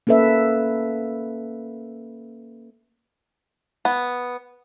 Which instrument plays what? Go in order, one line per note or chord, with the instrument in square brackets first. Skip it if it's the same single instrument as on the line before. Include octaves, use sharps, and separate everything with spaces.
[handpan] A#3 C#4 A4 B4 E5
[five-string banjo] B3